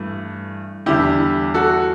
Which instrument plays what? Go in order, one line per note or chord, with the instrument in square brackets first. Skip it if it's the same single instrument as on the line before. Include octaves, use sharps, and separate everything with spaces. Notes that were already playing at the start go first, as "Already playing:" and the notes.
Already playing: [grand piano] G2 E3 A3
E2 D3 G3 E4 G4
F#4 A4